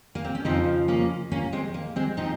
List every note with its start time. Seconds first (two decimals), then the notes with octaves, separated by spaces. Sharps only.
0.15 A#3
0.24 C4
0.35 C#4
0.45 F2 C#3 F3 C4 D#4
0.88 A#3 C#4
1.32 A#3 C#4
1.53 G#3 C4
1.74 A#3
1.96 G#3 C4
2.17 A#2 F3 C4 D#4